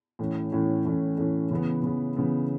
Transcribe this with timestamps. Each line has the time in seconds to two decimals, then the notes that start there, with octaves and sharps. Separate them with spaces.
0.19 A2 E3 A3 C#4
0.52 A2 E3 A3 C#4
0.85 A2 E3 A3 C#4
1.17 A2 E3 A3 C#4
1.51 C#3 E3 B3
1.83 C#3 E3 B3
2.16 C#3 E3 B3